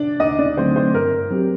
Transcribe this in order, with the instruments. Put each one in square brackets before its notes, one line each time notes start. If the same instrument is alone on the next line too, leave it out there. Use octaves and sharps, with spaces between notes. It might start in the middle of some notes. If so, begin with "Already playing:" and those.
Already playing: [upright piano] D4 D5
[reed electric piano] D2 [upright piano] D#4 D#5
[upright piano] D4 D5
[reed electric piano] D3 F#3 A3 C4 [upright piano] C5
[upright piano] C5
[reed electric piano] G2 [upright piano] A#4
[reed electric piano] F#3 C4 G4